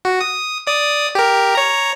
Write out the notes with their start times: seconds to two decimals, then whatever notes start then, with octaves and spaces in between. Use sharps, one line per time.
0.05 F#4
0.21 D#6
0.67 D5 D#6
1.15 G4 A#4
1.55 C#5 A#5